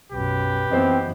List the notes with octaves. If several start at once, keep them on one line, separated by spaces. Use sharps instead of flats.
B1 F#2 G4 B4
F#2 E3 B3 C4 C5 D#5